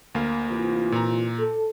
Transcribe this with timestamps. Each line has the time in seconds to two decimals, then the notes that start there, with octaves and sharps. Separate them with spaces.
0.15 D2 A#3 F5
0.48 C3 E3 F4
0.92 A#2 A#5
1.38 A4